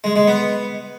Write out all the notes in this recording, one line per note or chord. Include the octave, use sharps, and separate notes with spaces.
G#3
G#3
B3